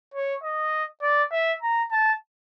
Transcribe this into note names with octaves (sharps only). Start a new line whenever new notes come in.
C#5
D#5
D5
E5
A#5
A5